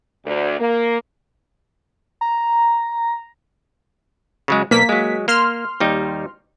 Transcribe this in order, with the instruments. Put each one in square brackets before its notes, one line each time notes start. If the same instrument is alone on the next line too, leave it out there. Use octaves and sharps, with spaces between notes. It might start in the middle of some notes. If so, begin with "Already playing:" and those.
[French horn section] D2
A#3
[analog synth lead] A#5
[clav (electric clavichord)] C#3 F#3 G#3
[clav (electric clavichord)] B1 [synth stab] A#3 B6
[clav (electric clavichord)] F#3 G#3
[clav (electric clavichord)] A#3 [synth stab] C6 F6
[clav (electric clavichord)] D#2 G3 D#4